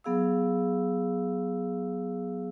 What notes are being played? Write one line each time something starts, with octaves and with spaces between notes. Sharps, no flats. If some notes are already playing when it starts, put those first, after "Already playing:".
F#3 B3 G#4 F5 E6